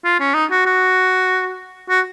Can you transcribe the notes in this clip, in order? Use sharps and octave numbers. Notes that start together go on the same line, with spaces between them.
F4
C#4
D#4
F#4
F#4
F#4